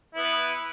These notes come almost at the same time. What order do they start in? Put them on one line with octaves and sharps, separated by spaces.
E4 B3 B4